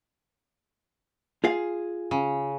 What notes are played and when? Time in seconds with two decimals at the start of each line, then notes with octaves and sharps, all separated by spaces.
1.44 F4 G#4 F5
2.11 C#3